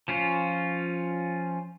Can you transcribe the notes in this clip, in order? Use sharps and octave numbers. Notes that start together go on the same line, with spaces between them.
F3 C#4 F4